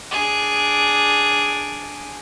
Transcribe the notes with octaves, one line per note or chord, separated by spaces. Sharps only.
D4 G#4